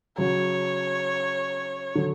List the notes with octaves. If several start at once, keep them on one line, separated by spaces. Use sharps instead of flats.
C#3 F#3 C#4 F#4 C#5
D3 F#3